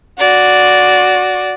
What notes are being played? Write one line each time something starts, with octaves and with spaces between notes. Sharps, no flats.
F#4 D5